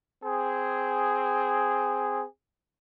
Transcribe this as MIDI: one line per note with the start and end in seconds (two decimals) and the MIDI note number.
0.24 2.23 60
0.24 2.23 68